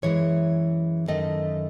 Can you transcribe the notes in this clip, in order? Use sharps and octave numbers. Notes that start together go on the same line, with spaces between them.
F#2 E3 G#3 C#5
F#2 D#3 A3 D#5